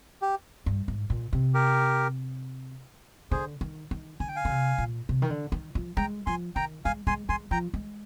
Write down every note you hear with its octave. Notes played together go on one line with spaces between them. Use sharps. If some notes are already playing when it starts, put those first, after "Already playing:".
G4
G2
G#2
A#2
C3
G4 A#4
D3 G#4 C5
D#3
D#3
D3 G#5
G5
F5 G#5
D3
C3
A#2
C3
D#3
D3
D#3
F3
G#3 G5 A#5
F3 G#5 C6
D#3 G5 A#5
G#3 F5 G#5
G#3 G#5 C6
G#3 G#5 C6
F3 G5 A#5
G#3